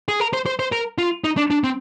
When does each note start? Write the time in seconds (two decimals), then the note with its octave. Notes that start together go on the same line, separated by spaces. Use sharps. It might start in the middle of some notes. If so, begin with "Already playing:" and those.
0.08 G#4
0.20 A#4
0.33 C5
0.46 C5
0.59 C5
0.72 A#4
0.98 F4
1.24 D#4
1.37 D4
1.51 D4
1.64 C4